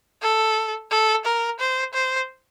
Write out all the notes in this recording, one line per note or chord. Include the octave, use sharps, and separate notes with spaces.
A4
A4
A#4
C5
C5